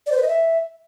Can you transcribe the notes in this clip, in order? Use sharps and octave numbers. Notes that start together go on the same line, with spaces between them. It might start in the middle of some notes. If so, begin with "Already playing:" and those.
D5
C5
B4
D#5
E5